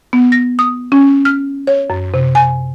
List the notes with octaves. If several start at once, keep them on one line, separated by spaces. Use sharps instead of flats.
B3
A#6
D#6
C#4
F6
C#5
F#2
C3
G#5